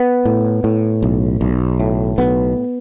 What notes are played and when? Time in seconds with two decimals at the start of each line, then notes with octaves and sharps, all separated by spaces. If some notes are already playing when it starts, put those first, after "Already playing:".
Already playing: B3
0.25 A2
0.64 A2
1.03 B1
1.41 B1
1.80 A2
2.18 B1 B3